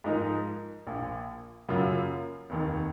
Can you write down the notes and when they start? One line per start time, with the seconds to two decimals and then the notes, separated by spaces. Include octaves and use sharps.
0.04 G#2 F3 G#3 D#4 A#4
0.87 A#1 A#2 F3
1.69 F#2 C#3 F#3 A#3 F4
2.50 F1 D#2 D#3